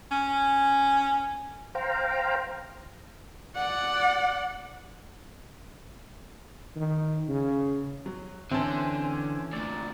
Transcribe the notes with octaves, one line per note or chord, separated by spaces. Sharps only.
C#4
C5 F5 G5 A#5
D5 F#5
D#3
C#3
F#3
D3 E3 C4 C#4 A5
D2 A#2 D5